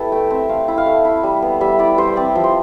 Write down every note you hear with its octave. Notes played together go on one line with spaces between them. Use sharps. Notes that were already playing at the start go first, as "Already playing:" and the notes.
Already playing: B3 E4 G4 A4 B4
A3 G5
C4 E5
A3 F5
E4
F5
A3
E4
G3
B3
G3 E5
E4 D5
G3 C5
C4 D5
F3
C5